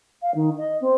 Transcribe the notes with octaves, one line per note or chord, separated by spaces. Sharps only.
F5
D#3
D#5
C4